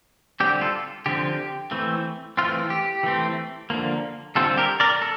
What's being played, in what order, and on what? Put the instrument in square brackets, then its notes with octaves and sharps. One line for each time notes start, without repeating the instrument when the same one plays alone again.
[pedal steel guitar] D3 G3 C4 G4
F4 A4
D3 F3 C4 G4
E3 A3 C4
E3 A3 C4 F4
G4
E3 A3 C4
D3 F3 A#3
D3 G3 C4 F4 A4
G4 A#4
A#4 D5
A4